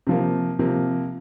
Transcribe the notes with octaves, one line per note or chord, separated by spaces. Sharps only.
C3 F3 A#3
C3 F3 A#3